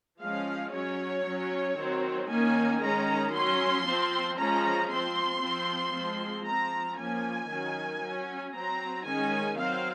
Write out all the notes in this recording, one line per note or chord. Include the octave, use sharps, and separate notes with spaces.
F3 G#3 C#4 F5
F#3 C#4 C#5
F#3 C#4
D#3 F#3 C4
D#3 A#3 C#4 G#5
D#3 G#3 C#4 A#5
F#3 C#4 C6
F3 C4
F3 G#3 C#4 A#5
F3 C4 C6
F3 C4
F3 G#3 C4
F3 C4 A#5
F3 A#3 C#4 G#5
D#3 F#3 C#4
F#3 C#4
F#3 C4 A#5
D#3 G#3 C#4 G#5
F#3 C4 F5